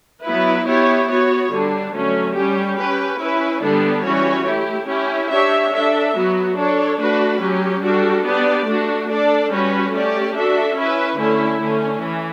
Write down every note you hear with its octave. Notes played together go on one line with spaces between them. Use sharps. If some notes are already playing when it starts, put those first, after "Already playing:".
F#3 B3 E4 B4
B3 E4 G4 C#5
B3 F#4 C#5
D3 G3 D4
D3 F#3 A3 C#4
G3 C#4 G4
C#4 G4 B4
C#4 E4 B4
D3 G3 B3 D4 A4
E3 G3 C#4 F#4 C#5
A3 E4 G4
C#4 E4 G4
D4 G4 C#5 E5
D4 A4 E5
F#3 B3 F#4
D4 A4 C#5
A3 D4 F#4 B4
F#3 C#4 G4
G3 D4 F#4 A4
B3 D4 G4 D5
A3 D4 F#4
D4 A4 D5
G3 C#4 F#4 B4
A3 C#4 G4 D5
D4 F#4 A4 E5
C#4 E4 B4 E5
D3 A3 C#4 E4
D3 A3 C#4
E3